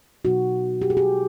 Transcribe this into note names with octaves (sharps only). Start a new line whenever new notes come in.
B2 F#3 B3 D#4 F#4
G4
G#4
G4